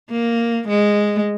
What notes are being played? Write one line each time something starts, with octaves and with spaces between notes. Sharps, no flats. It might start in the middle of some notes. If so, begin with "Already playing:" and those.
A#3
G#3